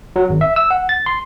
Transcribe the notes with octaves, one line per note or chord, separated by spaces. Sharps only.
F#3
G#1
E5
E6
F#5
A6
C6